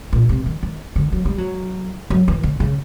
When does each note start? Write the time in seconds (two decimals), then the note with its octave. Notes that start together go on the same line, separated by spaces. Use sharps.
0.13 A#2
0.29 C3
0.46 D#3
0.63 D#3
0.96 D3
1.12 F#3
1.25 G3
1.38 F#3
2.10 F#3
2.28 E3
2.43 D3
2.60 C#3